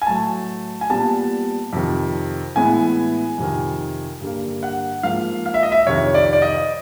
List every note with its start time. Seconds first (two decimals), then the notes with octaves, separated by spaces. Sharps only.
0.02 G#5
0.06 A2 F#3 A3 A5
0.81 G#5
0.90 A#2 G3 B3 A5
1.73 F2 C3 D#3
2.56 A2 E3 G#3 B3 G#5
3.38 F2 C3 D#3
4.20 G2 D3 G3 A#3
4.63 F#5
5.03 G#2 F3 A#3 F5
5.46 F5
5.54 E5
5.63 D#5
5.72 E5
5.87 F2 C3 D#3 C#5
6.14 D5
6.33 D5
6.42 D#5